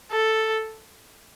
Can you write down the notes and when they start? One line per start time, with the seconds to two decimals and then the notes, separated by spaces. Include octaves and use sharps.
0.11 A4